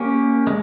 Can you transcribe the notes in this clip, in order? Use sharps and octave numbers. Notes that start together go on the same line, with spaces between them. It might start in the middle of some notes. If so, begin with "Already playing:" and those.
Already playing: A#3 C#4 G4
G#3